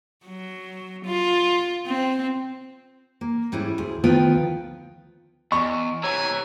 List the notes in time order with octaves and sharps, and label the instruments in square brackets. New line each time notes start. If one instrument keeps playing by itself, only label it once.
[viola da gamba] F#3
F4
C4
[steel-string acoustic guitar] A#3
G#2 G3 C#4 E4
D2 G#4
D2 D#3 F3 B3 F4 G5
[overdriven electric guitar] E2 [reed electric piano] D#5 [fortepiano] C#6
[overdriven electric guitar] C3 E3 [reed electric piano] C#5 A#5 E6 [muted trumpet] G#5